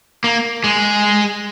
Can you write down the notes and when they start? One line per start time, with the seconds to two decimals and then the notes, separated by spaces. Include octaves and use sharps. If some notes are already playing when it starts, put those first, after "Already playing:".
0.24 A#3
0.64 G#3